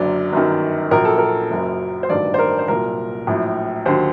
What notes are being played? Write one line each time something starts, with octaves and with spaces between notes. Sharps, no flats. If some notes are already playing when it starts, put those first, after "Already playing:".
Already playing: F#1 F#2 D3 F#3 D5
G1 F#2 D#3
A#1 A#2 F#3 A#4
A4
A#4
F#1 F#2 F#3
C5
A1 G2 D#3 F#3 D5
C5
A#4
C5
C2 A#2 F#3 A#4
A#1 A2 F#3
D#2 D3 F#3 C5